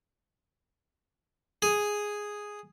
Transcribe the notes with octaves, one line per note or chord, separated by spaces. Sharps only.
G#4